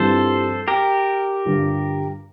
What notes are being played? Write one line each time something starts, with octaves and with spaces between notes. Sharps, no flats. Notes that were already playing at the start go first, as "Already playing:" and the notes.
Already playing: G2 E3 G3 C4 F4 A4 C5
G4 A#4
G2 D3 G3 D4 F4